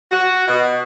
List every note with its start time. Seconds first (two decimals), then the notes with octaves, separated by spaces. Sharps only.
0.12 F#4
0.48 B2